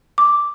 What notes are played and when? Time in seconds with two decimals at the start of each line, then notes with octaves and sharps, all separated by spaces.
0.18 D6